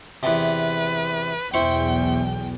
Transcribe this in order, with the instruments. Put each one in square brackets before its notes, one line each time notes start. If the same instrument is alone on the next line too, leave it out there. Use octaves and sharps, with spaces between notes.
[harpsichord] E2 C3 [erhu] B4
[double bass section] B1 E2 [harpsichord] E4 C5 C#6 [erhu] G5